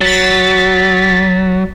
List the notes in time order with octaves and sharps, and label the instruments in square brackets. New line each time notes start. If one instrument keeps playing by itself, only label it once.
[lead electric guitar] F#3 [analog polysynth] A6 B6